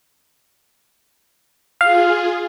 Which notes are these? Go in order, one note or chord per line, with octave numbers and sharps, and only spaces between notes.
F4 G#4 F5